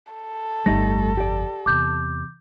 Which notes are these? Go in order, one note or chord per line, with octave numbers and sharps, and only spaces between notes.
A4
G1 F2 G3 A3 D#4 A#6
G4 D5
E2 C3 D6 G6